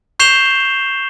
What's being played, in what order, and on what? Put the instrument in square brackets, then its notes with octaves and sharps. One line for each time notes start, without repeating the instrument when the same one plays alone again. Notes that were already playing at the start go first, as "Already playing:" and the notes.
[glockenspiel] C#6 G6 C7 E7 F7 G7